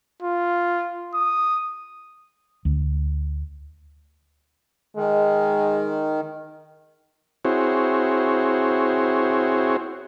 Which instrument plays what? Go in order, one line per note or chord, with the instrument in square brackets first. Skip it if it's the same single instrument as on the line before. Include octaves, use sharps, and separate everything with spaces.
[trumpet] F4
D#6
[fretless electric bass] D2
[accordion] D#3 [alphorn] G#3
[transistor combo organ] C4 E4 F#4 G#4 C5 C#5